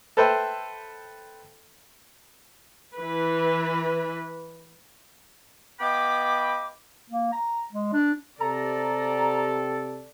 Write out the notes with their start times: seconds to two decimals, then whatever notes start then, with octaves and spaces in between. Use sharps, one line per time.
0.17 A4 B4 C5 E5 G5
2.94 E3 B4
5.80 B3 D#5 F5 G5 B5 D6
7.10 A#3
7.32 A#5
7.73 G#3
7.93 D4
8.41 C3 G4 A4 D5 A#5